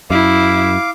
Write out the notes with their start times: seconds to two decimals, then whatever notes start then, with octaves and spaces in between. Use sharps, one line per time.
0.11 F#2 E4 F5 D6